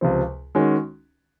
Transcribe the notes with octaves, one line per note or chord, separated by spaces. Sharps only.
C#2 C3 F3 C4
D#3 G#3 C#4 F#4